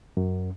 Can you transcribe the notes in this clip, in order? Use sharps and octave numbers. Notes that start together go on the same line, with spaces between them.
F#2